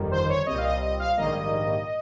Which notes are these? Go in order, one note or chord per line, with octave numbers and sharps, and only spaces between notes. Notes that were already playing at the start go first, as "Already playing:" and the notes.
Already playing: G1 F2 D#3 G3
C5
C#5
C2 A#2 G3 C4 D#5
F5
D#5
D#5
F5
A#1 G#2 D#3 G3 A#3 D#5